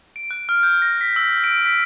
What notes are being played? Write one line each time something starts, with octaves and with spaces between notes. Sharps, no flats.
D7
F#6
F6
G6
A#6
B6
E6
D7
B6